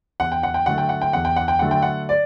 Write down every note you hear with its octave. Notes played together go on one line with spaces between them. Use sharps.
E2 F#5
G5
F#5
G5
D3 F#3 A3 F#5
G5
F#5
G5
E2 F#5
G5
F#5
G5
D3 F#3 A3 F#5
G5
F#5
D5